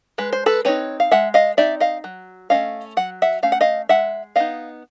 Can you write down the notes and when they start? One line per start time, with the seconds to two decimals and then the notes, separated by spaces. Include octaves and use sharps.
0.18 G#3 B4
0.33 C5
0.46 A4 B4
0.65 C4 D#4 B4 C#5
1.00 F5
1.11 G#3 E5 F#5
1.34 D#5 F5
1.57 C4 D#4 D5 E5
1.80 D#5 F5
2.04 F#3
2.50 A3 C#4 D#5 F5
2.97 F#3 F#5
3.22 E5 F#5
3.43 A3 C#4 F5
3.52 F#5
3.61 D#5 F5
3.89 G#3 E5 F#5
4.36 B3 D#4 D#5 F5